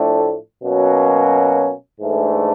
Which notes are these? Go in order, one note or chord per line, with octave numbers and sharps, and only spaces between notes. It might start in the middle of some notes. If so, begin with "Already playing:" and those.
Already playing: A2 F3 A3 D4
B2 F#3 A#3 C#4
G#2 E3 A3 D4